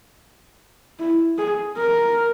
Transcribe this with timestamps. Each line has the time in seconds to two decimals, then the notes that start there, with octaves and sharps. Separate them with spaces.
0.99 E4
1.38 G#4
1.77 A#4